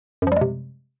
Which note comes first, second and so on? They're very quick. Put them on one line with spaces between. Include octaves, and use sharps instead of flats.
F#2 F3 G3 G#3 C3